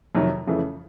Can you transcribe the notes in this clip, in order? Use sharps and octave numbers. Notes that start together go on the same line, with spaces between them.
F2 C3 D#3 F#3
F2 C#3 E3 A3